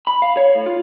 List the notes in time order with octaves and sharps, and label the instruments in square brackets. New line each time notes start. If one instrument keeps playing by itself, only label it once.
[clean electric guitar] B5
F5
C#5
A2
F4